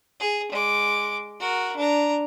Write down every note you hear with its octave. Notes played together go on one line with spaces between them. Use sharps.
G#4
G#3 D6
F#4 A#4
D4 A#5